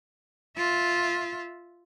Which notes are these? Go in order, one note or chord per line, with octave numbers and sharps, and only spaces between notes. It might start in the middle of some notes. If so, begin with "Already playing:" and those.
F4 E5